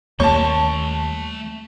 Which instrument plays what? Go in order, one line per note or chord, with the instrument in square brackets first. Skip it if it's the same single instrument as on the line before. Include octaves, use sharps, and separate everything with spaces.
[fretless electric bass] D#2 G3 A#3 [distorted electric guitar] A3 C6 [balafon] C#5 [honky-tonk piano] A5 C#6